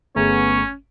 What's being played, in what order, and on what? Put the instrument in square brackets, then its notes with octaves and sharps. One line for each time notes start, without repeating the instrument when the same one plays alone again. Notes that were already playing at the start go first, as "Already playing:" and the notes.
[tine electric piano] G1 A3 A#5 [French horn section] B3 G#4 [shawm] C#4 [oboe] C#5